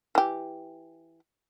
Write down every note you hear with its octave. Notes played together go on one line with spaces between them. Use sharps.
E3 G4